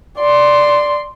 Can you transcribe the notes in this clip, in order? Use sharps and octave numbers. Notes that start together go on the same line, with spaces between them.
D5 C6